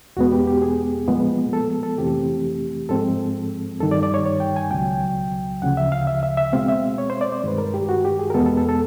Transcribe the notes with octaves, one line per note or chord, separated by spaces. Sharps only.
E2 B2 G#3 B3 F#4
G4
G4
G#4
A#2 F3 G#3 B3
A4
A4
F2 C3 E3 A3 C4 G4
G#2 F3 G#3 C4 A4
G2 D#3 G3 A4
D5
D5
C#5
C#5
G5
G#5
C#2 B2 F#3 G5
D2 C#3 F3 F#5
E5
F5
E5
E5
E5
B2 G#3 C4 F5
E5
C#5
C5
D5
C5
G2 D#3 G#3 B4
A#4
G4
F#4
G4
G#4
A#4
E2 B2 G#3 B3 A4
A4
A4
A4